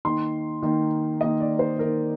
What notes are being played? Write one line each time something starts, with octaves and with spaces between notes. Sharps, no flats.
D#3 A#3 D#4 C6
D#3 A#3 D#4
D#3 A#3 D#4 D#5
D5
C5
D#3 A#3 D#4 A#4